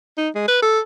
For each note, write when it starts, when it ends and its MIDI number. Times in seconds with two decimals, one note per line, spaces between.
0.18 0.29 63
0.35 0.45 56
0.48 0.60 71
0.62 0.80 69